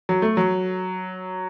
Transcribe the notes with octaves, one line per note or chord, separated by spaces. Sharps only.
F#3
A3
F#3